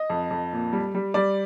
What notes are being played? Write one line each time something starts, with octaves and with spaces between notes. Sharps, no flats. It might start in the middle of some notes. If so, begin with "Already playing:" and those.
Already playing: D#5
F2
F2
A#2
G3
G3
G3 D5